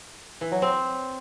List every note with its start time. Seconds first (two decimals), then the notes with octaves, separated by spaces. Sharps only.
0.41 E3
0.52 F#3
0.62 C4